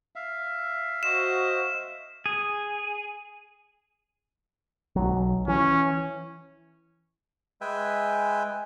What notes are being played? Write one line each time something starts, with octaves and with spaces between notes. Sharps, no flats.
E5 F5
F#4 C5 D#5 E7
G#4
B1 F#3
E3 C#4
G#3 B4 E5 G5 G#5